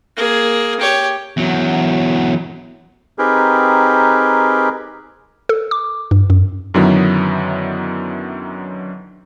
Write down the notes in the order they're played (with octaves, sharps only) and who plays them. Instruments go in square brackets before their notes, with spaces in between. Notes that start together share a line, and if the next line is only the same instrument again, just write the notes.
[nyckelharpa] A#3 G#4
G4 C#5
[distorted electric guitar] E2 F#3
[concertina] C4 D#4 G4 G#4 A#4 B4
[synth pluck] A4
D6
G2
F#2
[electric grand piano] F#2 D3 D#3 F#3 B3 E4